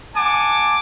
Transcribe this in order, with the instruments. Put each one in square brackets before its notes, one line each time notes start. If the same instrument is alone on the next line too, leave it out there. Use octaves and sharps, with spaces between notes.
[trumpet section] F#5 G#5 A5 D6